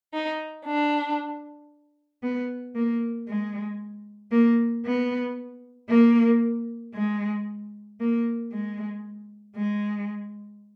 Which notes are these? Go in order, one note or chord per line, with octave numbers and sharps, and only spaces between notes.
D#4
D4
B3
A#3
G#3
A#3
B3
A#3
G#3
A#3
G#3
G#3